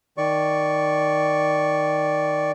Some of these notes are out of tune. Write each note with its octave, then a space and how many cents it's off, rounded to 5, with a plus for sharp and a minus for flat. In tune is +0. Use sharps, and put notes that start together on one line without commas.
D#3 +0 D5 -5 C#6 +0